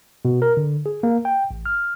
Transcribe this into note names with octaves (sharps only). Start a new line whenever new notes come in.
B2
A#4
D3
G#4
A#3
G5
A1
F6